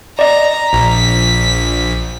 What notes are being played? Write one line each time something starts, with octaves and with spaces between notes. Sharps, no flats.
D5 D#5 A#5
A#1 B6